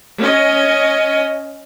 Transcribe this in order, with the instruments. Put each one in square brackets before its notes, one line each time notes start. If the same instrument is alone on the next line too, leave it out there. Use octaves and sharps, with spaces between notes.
[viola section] C#4 D#5